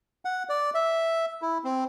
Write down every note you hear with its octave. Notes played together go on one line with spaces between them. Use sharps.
F#5
D5
E5
E4
C4